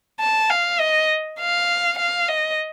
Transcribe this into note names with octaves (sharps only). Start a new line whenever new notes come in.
A5
F5
D#5
F5
F5
D#5